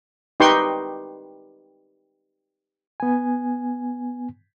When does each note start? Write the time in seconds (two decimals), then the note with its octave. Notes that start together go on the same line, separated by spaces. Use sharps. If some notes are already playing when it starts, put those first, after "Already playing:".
0.40 D#4 G4 B4 G5 C6 C#6
3.00 B3 G#5